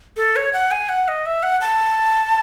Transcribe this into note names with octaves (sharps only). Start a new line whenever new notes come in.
A4
C#5
F#5
G#5
F#5
D#5
E5
F#5
A5